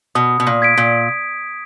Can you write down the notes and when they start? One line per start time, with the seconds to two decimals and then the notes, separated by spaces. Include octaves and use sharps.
0.15 B2 D#6
0.40 B2
0.47 A#2
0.62 G#6 B6 D7
0.77 A#2